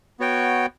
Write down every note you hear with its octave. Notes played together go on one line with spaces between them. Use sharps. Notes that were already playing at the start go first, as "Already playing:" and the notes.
B3 F#4 C#5 G5